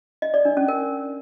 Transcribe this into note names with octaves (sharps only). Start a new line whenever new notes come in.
D#5
D5
D4
C#4
A#4